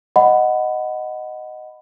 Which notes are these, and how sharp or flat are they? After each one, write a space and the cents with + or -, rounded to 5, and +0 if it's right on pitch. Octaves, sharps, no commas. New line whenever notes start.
D#5 +0 F#5 +0 B5 +15